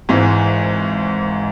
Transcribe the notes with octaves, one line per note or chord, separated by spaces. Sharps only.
G#1 G#2 E3 G#3